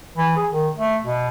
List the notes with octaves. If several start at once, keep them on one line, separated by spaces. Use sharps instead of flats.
E3
G#4
D#3
A3
B2